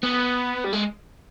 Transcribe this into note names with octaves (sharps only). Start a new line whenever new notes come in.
B3
G3
G#3